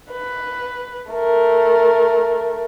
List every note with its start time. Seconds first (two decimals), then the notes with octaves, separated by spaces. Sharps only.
0.10 B4
1.11 A3 A#4